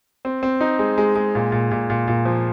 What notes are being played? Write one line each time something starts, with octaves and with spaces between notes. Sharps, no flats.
C4
C4
D#4
G#3
G#3
G#3
A#2
A#2
A#2
A#2
A#2
F3